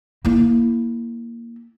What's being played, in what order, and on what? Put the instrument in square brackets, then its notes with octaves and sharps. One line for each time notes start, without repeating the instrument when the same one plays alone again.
[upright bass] A#3 E4